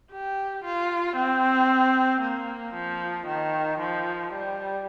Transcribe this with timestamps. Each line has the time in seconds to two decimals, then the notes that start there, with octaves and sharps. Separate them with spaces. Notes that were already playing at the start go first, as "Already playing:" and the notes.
0.11 G4
0.64 F4
1.16 C4
2.21 A#3
2.74 F3
3.27 D#3
3.79 F3
4.33 G3